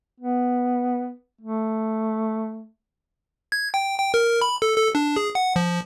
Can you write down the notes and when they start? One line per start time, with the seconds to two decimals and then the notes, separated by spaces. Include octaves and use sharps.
0.20 B3
1.41 A3
3.52 G#6
3.74 G5
3.98 G5
4.14 A#4
4.41 B5
4.62 A4
4.76 A4
4.95 D4
5.17 G#4
5.35 F#5
5.56 F3